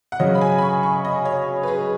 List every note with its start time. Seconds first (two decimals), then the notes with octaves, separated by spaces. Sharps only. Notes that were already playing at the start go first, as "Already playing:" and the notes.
0.12 F#5
0.20 F#2 C#3 F#3 C#4 D#5
0.35 B5
0.41 G#5
0.58 B5
0.62 C#6
0.83 C#6
1.05 D#5
1.25 C#5
1.63 B4
1.68 G#4